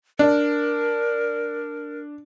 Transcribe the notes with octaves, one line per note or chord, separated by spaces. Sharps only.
D4 A#4